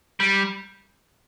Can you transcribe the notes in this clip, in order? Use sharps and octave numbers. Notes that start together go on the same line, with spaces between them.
G3